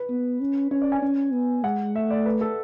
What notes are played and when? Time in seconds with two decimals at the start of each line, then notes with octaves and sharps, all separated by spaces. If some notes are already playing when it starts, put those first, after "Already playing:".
Already playing: B4
0.09 B3
0.41 C#4
0.71 C#4 C#5
0.82 D5
0.92 G#5
1.02 C#4
1.33 B3
1.64 G#3 F#5
1.95 A3 E5
2.10 D5
2.26 B4
2.41 A4